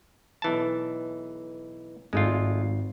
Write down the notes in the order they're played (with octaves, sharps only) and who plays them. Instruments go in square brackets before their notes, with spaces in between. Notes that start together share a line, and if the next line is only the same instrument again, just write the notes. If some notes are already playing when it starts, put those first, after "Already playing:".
[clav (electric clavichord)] B1 E3 A5
[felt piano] G#1 [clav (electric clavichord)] G#3 A3 F4